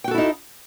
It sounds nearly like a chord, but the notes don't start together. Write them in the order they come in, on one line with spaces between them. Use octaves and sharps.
G5 F#4 A4 E4 D#4